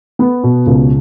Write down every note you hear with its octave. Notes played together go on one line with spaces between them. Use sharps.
B3
B2
C#2